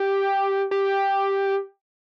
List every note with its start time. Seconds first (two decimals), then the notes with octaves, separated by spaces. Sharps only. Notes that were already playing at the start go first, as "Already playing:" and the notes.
Already playing: G4
0.71 G4